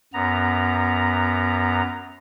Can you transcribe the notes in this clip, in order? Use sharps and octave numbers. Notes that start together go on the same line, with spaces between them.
F#2 B3 A#5